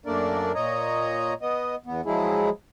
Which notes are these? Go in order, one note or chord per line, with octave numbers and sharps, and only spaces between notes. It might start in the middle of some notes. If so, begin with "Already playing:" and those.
F#2 A3 A#3 D4 A#4 D5
A#2 C#5 D#5 A#5
B3 D#5
E2 B3
F3 F#3 G#3 E4 G#4